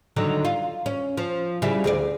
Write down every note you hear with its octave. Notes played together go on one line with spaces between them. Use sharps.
D3 D#3 F#3
F4
C#4
F3
C#3 G3 E4
D2 G#4 D5